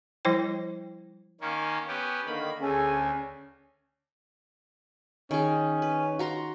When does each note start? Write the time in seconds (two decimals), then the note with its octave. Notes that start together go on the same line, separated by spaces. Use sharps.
0.25 F3 G3 E4 C5 G5
1.41 D#3 A#3 C#4
1.88 B3 C#4 G4
2.27 D3 D#3 A#3 B5
2.62 D2 C#4 G#4 A4 G#5
5.31 D#3 C#4 G#4
5.82 B4
6.19 F#4 A#5 C6